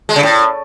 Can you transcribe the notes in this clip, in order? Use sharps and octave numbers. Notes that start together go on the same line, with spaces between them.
G#3
C#3
A2